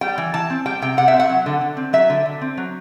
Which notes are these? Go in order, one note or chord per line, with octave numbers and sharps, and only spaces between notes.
G3 G5
E3
E3 A5
C4
G3 G5
C3 G5
C3 F#5
E5
C4
F#5
F#3
D3
D3
C4
F#3 E5
D3
D3
C4
F#3